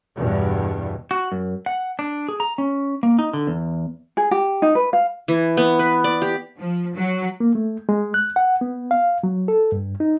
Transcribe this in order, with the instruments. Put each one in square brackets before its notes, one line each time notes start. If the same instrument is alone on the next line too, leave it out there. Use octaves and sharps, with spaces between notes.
[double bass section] E2 G2 B2
[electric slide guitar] F#4
F#2
F#5
D4
G#4
A#5
C#4
A#3
D#4
D3
E2
[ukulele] G#4
G4
D#4
B4
F5
[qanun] E3
B3
B4
D5
G4
[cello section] F3
F#3
[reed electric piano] A#3
A3
G#3
F#6
F#5
B3
F5
F#3
A4
G2
D#4